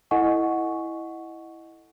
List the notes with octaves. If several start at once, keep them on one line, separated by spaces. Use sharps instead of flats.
E4 A4 D#5 F#5 G#5 C#6